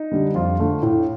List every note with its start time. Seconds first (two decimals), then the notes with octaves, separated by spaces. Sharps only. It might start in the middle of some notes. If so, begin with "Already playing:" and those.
Already playing: D#4
0.11 D3 G3
0.35 F2 F4
0.59 D3 A3
0.83 A2